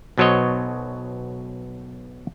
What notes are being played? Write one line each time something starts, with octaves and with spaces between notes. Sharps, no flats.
B1 B2 F#3 C5 C#5 D#5